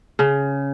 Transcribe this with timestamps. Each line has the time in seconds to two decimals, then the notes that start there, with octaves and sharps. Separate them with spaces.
0.19 C#3